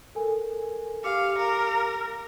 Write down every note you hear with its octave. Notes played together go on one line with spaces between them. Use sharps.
A4 A#4 G#5
G4 F5 D6 C#7
A#4